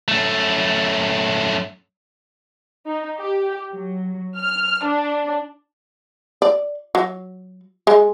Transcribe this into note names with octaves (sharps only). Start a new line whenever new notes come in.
F#2 A3
D#4
G4
F#3
F6
D4
D5
F#3
G#3